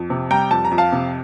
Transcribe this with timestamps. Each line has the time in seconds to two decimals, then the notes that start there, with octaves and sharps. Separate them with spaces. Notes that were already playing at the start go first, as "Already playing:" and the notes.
Already playing: F2
0.10 C3
0.31 G3 G5 A#5
0.51 F2 A5
0.65 A#5
0.71 F2
0.78 F5 A5
0.92 C3